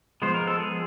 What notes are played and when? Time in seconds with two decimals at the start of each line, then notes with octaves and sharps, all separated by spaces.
0.22 F3 G#3 B3 C5
0.34 A#4
0.47 A4
0.59 G#4